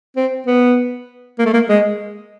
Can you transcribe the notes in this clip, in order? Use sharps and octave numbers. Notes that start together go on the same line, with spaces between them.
C4
B3
A#3
A3
A#3
G#3